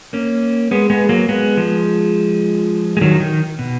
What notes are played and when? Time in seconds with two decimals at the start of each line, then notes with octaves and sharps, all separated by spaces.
0.13 A#3 C#4
0.71 G#3 B3
0.90 G#3 B3
1.09 F#3 A#3
1.29 G#3 B3
1.57 F3 G#3
2.97 G#3
3.01 D#3 F#3
3.20 D#3
3.59 B2